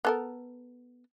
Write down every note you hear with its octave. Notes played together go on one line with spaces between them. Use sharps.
B3 A4 A#4